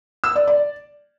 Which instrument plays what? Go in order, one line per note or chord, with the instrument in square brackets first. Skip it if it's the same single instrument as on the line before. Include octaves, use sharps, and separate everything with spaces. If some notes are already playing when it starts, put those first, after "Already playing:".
[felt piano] E6
D5
D5